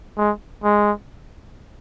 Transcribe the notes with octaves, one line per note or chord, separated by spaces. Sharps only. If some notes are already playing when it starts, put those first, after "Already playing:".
G#3
G#3